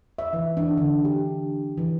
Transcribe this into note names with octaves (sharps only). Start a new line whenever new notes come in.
E5
E3
D4
D3
G4
E3